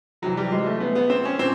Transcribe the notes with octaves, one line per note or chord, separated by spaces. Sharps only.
F1 F2 C3 E3 F#3
G3
G#3
A3
B3
B3
C4
C#4
A#2 C4